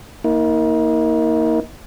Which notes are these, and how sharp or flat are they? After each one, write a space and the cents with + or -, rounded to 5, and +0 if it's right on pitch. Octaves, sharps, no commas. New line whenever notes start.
A#3 +0 D#4 +40